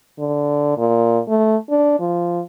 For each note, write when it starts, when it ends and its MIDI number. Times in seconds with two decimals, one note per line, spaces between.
0.19 0.76 50
0.77 1.19 46
1.28 1.56 57
1.69 1.98 62
1.99 2.41 53